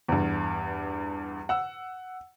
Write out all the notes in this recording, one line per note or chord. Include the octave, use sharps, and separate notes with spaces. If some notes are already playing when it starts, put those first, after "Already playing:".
E2 G2
F#5 E6